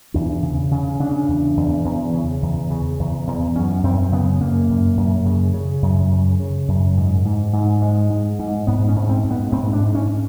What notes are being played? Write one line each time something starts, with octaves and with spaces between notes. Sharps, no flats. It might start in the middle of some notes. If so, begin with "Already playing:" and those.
E2 D4
C#3
C#3
C#3 D4
E2
E2
E2
C#3
E2
C#3
E2
E2
F#2 C#4
F#2 C4
C#3 B3
F#2 A#3
F#2
F#2
C#3
C#3
F#2
C#3
C#3
F#2
G#2
G#2
G#2
G#2 G#3
G#2
G#2
G#2 B3
C#4
G#2
C4
G#2
B3
G#2 C4
D4
G#2
C#4